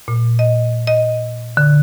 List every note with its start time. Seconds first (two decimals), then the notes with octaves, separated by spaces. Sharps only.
0.08 A#2
0.39 D#5
0.87 D#5
1.57 D3